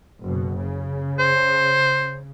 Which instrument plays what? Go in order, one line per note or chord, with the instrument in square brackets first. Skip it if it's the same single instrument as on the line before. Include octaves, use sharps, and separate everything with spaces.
[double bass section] F#1 B2
C#3
[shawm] C5